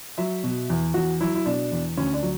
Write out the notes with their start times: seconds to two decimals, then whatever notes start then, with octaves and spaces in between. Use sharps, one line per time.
0.18 F#3 E5
0.44 B2
0.70 E2
0.94 E2 F#4
1.20 F#3 E4
1.35 E4
1.46 B2 D4
1.72 E2
1.97 D2 C#4
2.14 D4
2.23 F#3